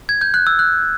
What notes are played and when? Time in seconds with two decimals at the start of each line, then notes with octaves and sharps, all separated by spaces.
0.09 G#6
0.21 G6
0.34 F#6
0.47 E6
0.59 F#6